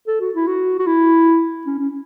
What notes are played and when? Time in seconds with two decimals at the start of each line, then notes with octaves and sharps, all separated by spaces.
0.07 A4
0.20 F#4
0.35 E4
0.47 F#4
0.79 F#4
0.87 E4
1.66 C#4
1.79 C#4